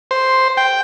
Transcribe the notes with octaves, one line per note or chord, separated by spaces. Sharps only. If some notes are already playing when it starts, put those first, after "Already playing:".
C5
G5